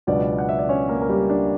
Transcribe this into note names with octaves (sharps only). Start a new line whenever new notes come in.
C#2 B2 F#3 B3 D4 D5
F#5
E5
D5
C#4 C#5
A#3 A#4
A#4
G3 G4
D4